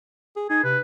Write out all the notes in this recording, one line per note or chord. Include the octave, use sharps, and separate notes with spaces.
G#4
D#4 G#4
C3 B4